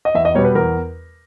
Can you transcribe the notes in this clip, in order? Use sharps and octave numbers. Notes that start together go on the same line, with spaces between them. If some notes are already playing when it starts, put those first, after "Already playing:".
D#5
E2 E5
D#5
B2 G3 B3 C#5
B4
E2 A#4